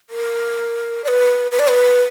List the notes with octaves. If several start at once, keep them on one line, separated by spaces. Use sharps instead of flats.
A#4
D5
B4
B4
D5
B4